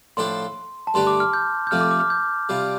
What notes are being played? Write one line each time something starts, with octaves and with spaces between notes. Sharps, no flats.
A2 F3 D4 A4 C5 C6
A5
G2 D3 A3 D4 G4 C6
D6
F6
G6
G6
F2 C3 F3 A3 F6
D6
D6
F6
G6
C3 G3 F4